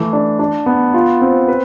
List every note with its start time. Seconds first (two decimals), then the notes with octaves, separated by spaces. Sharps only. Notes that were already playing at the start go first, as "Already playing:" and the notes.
Already playing: E3 A3
0.13 D4
0.39 D4
0.66 B3
0.94 F4
1.21 C4
1.48 B4